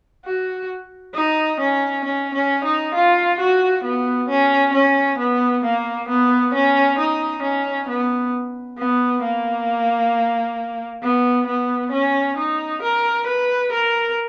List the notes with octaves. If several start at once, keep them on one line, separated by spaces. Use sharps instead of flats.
F#4
D#4
C#4
C#4
C#4
D#4
F4
F#4
B3
C#4
C#4
B3
A#3
B3
C#4
D#4
C#4
B3
B3
A#3
B3
B3
C#4
D#4
A#4
B4
A#4